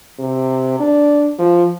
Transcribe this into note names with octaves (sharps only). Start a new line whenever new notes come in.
C3
D4
F3